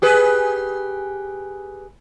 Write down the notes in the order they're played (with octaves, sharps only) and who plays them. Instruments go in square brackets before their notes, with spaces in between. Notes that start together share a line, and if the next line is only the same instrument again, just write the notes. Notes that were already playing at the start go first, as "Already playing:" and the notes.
[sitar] G4 G#4 B4